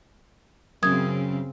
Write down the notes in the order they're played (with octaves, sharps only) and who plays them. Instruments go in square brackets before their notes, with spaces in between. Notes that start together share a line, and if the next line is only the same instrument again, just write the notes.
[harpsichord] F#2 [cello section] C#3 C4 [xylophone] D#6 G#6